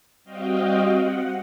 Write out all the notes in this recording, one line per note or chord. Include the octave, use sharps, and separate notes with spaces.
G3 C4 F#4 D#5 F5 G5
F#5